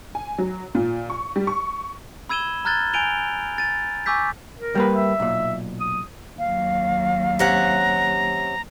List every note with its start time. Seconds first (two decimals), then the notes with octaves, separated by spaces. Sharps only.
0.15 G#5
0.38 F#3
0.75 A#2
1.10 C#6
1.36 G3
1.47 C#6
2.29 B5 E6 G#6 D#7 E7 G7
2.65 A#5 F6 F#6 G#6 A6 G7
2.93 G#5 G6 D7 D#7 F7 G7
3.58 A6 D#7
4.06 G#5 C#6 D6 E6 G6 B6
4.59 A#4
4.75 G3 A#3 B4
4.93 E5
5.20 B1 A#2
5.81 D#6
6.39 D#2 F#3 F5
7.39 C3 C#4 F#5 A#5